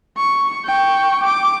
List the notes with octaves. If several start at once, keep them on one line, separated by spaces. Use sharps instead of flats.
C#6
G5 C#6
D6